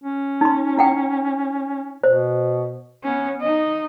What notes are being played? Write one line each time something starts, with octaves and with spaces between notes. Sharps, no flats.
C#4
D#4 C6
E4 F#5 G5
B2 C5
B3 C#4
D#4 D#5